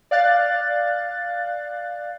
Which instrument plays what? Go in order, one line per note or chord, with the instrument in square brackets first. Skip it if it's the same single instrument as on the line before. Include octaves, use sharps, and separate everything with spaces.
[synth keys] D5 F5 F#6 A6